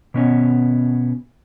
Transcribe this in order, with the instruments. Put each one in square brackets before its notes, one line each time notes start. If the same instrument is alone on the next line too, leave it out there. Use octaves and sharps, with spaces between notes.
[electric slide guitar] B2 B3 C#4